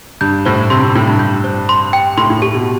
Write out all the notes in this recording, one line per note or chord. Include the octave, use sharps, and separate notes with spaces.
G2 G6
A2 C5
C3 C6
C3
A2 G5
G2
G6
C5
C6
G5
A2 C6
A2
G4
B2